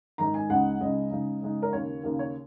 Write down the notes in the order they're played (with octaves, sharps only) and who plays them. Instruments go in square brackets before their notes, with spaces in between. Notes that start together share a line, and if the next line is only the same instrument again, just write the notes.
[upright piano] G#2 D#3 G#3 D#4 A#5
G#5
C#2 C#3 G#3 D#4 F#5
C#2 C#3 G#3 D#4 D#5
C#3 G#3 D#4
C#3 G#3 D#4
A#4
D#2 C#3 A#3 C#5
D#2 C#3 A#3
C#5